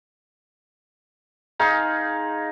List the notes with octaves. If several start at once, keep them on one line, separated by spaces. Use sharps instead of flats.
D#4 G#4 F5 C6